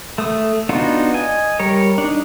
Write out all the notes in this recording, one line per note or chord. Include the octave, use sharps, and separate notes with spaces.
A3 D#6
B3 D4 D#4 F4 F#4
D#5 G#5
G3 A#4 C#5
D4 D#4